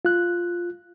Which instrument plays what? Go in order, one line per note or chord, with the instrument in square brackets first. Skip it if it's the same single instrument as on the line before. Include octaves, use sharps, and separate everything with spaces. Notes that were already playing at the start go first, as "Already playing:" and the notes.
[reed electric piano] F4 F#6